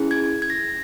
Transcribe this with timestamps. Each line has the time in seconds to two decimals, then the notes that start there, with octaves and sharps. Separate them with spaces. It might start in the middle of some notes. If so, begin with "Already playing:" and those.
Already playing: C#4 E4 G#4
0.11 G#6
0.42 G#6
0.50 A#6